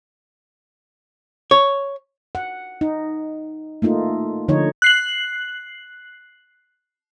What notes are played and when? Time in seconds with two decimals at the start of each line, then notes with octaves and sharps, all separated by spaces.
1.51 C#5
2.35 F#5
2.81 D#4
3.82 A3 A#3 D#4 F4
4.48 D3 F3 D#4 C#5
4.82 F#6 C7 F#7